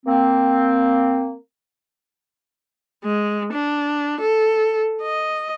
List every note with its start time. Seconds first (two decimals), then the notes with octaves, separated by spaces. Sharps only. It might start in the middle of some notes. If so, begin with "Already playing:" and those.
0.06 A#3 C4
3.04 G#3
3.53 D4
4.21 A4
5.02 D#5